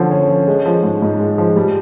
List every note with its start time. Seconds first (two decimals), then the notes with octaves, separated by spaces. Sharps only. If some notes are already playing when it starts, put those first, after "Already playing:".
Already playing: D3 F3 C#4
0.11 C#4
0.29 F3
0.48 G#3
0.66 F3
0.83 G#2
1.02 G#2
1.19 G#3
1.38 F3
1.56 G3